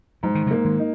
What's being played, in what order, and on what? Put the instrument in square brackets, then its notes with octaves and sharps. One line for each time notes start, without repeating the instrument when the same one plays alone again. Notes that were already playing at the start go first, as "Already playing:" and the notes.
[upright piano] G#2 [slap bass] F#3
[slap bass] D#3
C#3 F#3
[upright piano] A#3
[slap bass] D#3 G#3
[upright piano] D#4